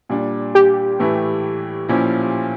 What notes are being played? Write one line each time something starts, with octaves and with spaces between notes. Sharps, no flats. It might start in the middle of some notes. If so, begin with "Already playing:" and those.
A#2 G3 D4
G4
A2 E3 A3 E4
A#2 F3 C#4 E4